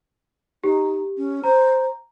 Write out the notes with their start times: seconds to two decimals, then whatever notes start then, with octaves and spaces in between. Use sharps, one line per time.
0.64 D#4 G4
1.17 C#4
1.44 C5 A#5